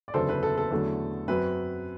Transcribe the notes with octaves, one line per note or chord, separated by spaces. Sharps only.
D5
F#1 E2 D3 F#3 B3 A4 C5
B4
A4
A4
E2 D3 F#3 A3
F#2 F#3 C4 B4